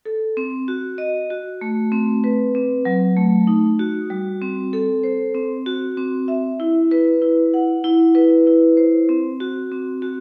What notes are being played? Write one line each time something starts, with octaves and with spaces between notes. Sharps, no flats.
A4
C4
F#4
D#5
F#4
A3
C4
B4
C4
F#3
A3
D#4
F#4
G3
C4
A4
C5
C4
F#4
C4
E5
E4
B4
E4
F#5
E4
B4
E4
C5
C4
F#4
C4
F#4